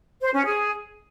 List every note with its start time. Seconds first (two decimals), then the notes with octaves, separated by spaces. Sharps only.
0.22 C5
0.33 C#4
0.45 G#4